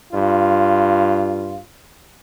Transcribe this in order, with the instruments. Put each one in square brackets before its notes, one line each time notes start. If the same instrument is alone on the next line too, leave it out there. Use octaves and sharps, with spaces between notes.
[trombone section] G2 F4